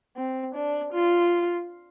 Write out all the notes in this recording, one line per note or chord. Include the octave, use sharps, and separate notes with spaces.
C4
D4
F4